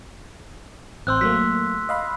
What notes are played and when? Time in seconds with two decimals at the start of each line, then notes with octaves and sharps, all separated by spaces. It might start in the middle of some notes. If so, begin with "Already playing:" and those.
1.07 A1 C4 C6 E6 F#6 G6
1.21 F#3 A3 A#3 B6
1.89 D#5 F5 B5